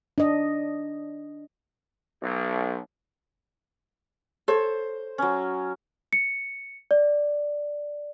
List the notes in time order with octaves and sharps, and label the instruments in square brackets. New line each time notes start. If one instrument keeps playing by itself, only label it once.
[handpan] D4 D#5
[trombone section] B1
[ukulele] A4 C#5 [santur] C5
[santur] F#3 C#4
[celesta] C#7
D5